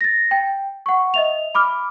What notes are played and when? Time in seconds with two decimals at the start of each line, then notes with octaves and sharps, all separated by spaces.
0.01 A6 A#6
0.31 G5
0.86 F#5 C#6
1.14 D#5 E5 F7
1.55 B5 D6 F6